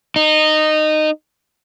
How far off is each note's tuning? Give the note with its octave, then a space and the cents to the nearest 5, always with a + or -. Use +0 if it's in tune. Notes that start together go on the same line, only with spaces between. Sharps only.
D#4 -15